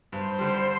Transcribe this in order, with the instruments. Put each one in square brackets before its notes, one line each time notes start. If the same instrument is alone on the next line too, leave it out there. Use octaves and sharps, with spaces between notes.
[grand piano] G2 [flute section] C5
[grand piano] D3 G3